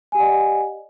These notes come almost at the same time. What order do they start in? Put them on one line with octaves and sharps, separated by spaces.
G#5 G4 F#5 D5 D#5